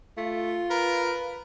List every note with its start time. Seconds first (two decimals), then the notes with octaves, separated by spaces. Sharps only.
0.17 A3 F4
0.70 A#4 B4